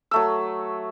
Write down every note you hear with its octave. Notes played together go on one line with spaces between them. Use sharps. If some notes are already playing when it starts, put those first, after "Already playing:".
F#3 A3 E6